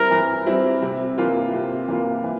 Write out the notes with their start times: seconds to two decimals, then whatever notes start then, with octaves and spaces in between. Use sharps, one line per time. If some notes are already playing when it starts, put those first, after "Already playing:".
Already playing: G3 C4 E4 A#4
0.11 E3
0.46 G3 C4 E4
0.82 C3
1.18 E3 A#3 F4
1.53 C3
1.88 E3 A#3 F4
2.24 E3